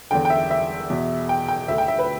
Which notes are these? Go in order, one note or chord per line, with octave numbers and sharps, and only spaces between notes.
E2 D3 G5
G5
E5
E5
E2 B2
G5
G5
D2 D3 E5
G5
E5
B4